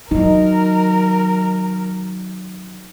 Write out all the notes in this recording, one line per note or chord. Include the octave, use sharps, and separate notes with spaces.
D#3 F#3 D#4 A#4